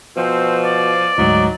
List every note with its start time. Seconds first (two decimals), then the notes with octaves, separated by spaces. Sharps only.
0.17 B2 F3 C4
0.65 D5
1.18 D2 G#2 F#3 D#4